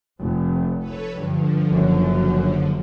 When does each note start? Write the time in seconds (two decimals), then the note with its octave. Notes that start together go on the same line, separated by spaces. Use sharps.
0.20 F1
0.78 A4 B4 C#5
1.14 G2 D3 F3
1.69 F#1 F#2